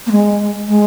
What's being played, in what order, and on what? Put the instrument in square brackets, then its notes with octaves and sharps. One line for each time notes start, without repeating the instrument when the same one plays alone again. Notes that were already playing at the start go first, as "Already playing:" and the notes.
[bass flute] A#3
G#3
G#3